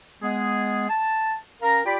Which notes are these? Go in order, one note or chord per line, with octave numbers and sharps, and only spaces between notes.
G#3 B3 G#4
A5
C#4 A#4 F5 A#5
F4 G4 D5 G5 B5